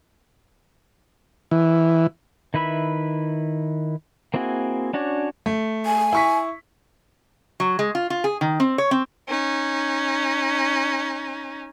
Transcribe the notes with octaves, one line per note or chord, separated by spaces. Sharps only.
E3
D#3 E4 B4 E5 B5
A#3 C4 E4 F#4 G#4
C#4 D4 F#4 C#5 D5
A3
G#5
E4 C#6 B6
F#3
G#3
F4
F4
G#4
D#3
C4
C#5
C4
C#4 D#4